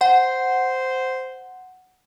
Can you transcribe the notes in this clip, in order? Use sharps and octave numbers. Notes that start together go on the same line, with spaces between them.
C5 F#5